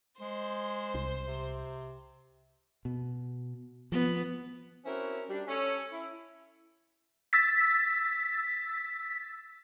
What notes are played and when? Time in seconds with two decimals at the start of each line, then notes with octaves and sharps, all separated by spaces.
0.21 G#3 C5
0.94 C2
1.27 C3
2.85 B2
3.92 F3 B3
4.85 C4 C#4 E4 F#4 A#4 C5
5.28 G3 D4
5.47 C#4 A4
5.92 E4
7.33 E6 A6 B6